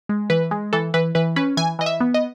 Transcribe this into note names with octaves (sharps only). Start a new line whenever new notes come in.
G#3
E3 B4
G#3
E3 A4
E3 B4
E3 B4
C#4 B4
E3 G#5
E3 D#5
E5
B3
D#5